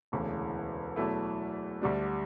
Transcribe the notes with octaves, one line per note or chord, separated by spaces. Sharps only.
E1 D2 C#3 E3
E2 B2 F#3 A3 E4
D2 D3 G3 D4